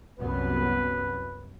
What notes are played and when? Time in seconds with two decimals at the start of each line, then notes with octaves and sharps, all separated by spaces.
0.19 C2 F#2 B3 B4